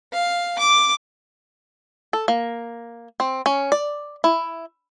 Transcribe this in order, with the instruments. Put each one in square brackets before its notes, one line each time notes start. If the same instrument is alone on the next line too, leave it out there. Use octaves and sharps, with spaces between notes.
[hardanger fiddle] F5
D6
[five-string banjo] A4
A#3
C4
C#4
D5
E4